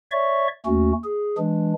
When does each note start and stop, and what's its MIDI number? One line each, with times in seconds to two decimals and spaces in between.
0.12 0.48 73
0.12 0.48 74
0.12 0.48 76
0.12 0.48 85
0.66 0.93 39
0.66 0.93 57
0.66 0.93 61
0.66 0.93 66
1.04 1.36 68
1.38 1.73 52
1.38 1.73 56
1.38 1.73 62